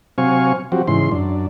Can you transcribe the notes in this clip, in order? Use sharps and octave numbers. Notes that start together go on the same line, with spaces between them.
C3 F#3 C4 F5 G#5 C#6
F3 F#3 C4 F#4 G4
G#2 C#3 E3 C6
F#2 D4